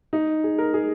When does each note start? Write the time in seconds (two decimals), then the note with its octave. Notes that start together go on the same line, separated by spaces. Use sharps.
0.13 D#4
0.44 G#4
0.58 A#4
0.74 G#4